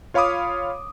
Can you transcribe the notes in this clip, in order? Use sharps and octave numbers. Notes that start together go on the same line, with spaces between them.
F4 C#5 F5 B5 D6 D#6